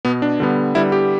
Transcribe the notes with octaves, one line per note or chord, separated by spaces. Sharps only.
B2 B3
D4
D3 G3 B3
D3 G3 B3 E4
G4